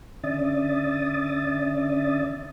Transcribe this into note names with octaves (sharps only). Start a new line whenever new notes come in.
D3 C#4 D5 E5 D#6 A6